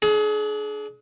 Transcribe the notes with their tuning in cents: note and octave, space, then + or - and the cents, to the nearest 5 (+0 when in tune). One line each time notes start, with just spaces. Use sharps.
D4 -5 G#4 +35